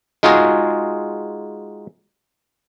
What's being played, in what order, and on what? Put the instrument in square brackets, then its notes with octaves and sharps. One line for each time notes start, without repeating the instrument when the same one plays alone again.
[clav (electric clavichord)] G#3 D#4 F4 F#4 G#4